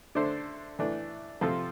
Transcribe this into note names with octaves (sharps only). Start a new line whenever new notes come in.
D3 A3 D4 A4 C5
E3 A3 D4
C3 F3 C4 F4 A4